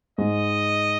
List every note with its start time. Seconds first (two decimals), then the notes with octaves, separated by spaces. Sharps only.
0.18 G#2 G#3 D#5